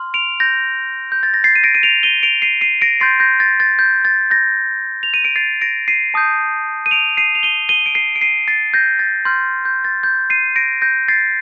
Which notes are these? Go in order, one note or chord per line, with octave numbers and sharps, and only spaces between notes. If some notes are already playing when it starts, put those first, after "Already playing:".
Already playing: C6 F6
D7 F7
G6 A#6
G6
A6
A#6
A6 C7
D#7
A#6 D7
D#7
D7 F7
D#7 G7
D7 F7
C7 D#7
C7 D#7
A#6 D7
C6 G6 A6 C7
G6 A#6
A6
A6
G6
A6
G6 A#6
F7
D#7
D7
A6 C7
A#6 D7
C7 D#7
A5 D#6 G6
D#7
D7 F7
C7 D#7
F7
D#7 G7
D#7 G7
D7
C7 D#7
D7
C7 D#7
A6 C7
G6 A#6
A6
C6 F6 G6
G6
A6
G6
C7 D#7
A#6 D7
G6 A#6
A6 C7